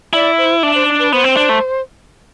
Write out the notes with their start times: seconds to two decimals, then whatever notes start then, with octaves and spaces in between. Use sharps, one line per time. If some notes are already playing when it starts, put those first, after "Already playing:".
0.13 E4 D5
0.38 C5
0.63 D4 E5
0.75 C5
0.99 B4
1.12 B3 C5
1.24 C4
1.37 D4
1.49 A3